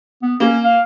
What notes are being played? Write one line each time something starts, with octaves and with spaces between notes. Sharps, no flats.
B3
A#3 C#4
F5